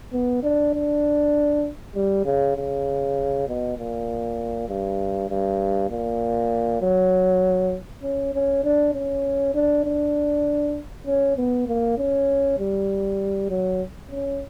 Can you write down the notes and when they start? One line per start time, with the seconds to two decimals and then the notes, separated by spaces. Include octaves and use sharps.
0.13 B3
0.43 D4
0.74 D4
1.96 G3
2.25 C#3
2.57 C#3
3.48 B2
3.78 A#2
4.69 G2
5.30 G2
5.91 A#2
6.81 F#3
8.03 C#4
8.34 C#4
8.64 D4
8.94 C#4
9.55 D4
9.85 D4
11.07 C#4
11.38 B3
11.67 A#3
11.98 C#4
12.59 G3
13.50 F#3
14.11 C#4